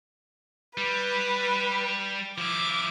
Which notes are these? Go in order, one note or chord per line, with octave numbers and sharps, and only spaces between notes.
G3 B4
F3 E4 D6